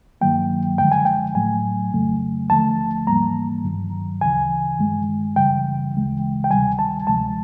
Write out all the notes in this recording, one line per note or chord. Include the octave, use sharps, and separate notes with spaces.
G2 D#3 F#3 A#3 G5
F#2 D3 F3 G#3 G5
G#5
G5
A2 F#3 A3 G#5
F2 C#3 F#3 A3
D#2 D3 F3 A3 A5
G#2 E3 G3 A#3 A#5
G2 D#3 F#3
D2 C#3 E3 G#5
G2 D#3 G#3
F#2 C#3 E3 G3 G5
D2 C#3 E3 G#3
G5
D2 C3 D#3 G3 G#5
A5
D2 C3 F3 G#3 A5